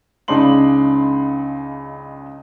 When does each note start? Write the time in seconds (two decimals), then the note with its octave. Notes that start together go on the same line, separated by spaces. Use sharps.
0.28 C#2 C#3 D4 D#4 C6 F#7